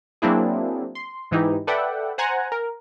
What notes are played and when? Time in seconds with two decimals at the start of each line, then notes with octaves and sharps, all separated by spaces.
0.22 F#3 A#3 C4 D4 E4 G#4
0.95 C6
1.31 G#2 E3 D#4 E4 G4
1.67 A4 B4 D5 E5 F#5 G5
2.18 C5 F#5 G#5 A#5
2.52 A#4